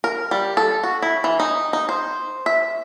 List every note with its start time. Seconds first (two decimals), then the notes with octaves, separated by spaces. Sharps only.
0.04 A#4
0.31 G3
0.57 A4
0.83 F#4
1.02 E4
1.24 E3
1.40 D#4
1.73 D#4
1.89 C5
2.46 E5